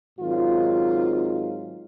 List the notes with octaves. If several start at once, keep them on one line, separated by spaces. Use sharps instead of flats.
G#2 D#3 F#3 C4 F4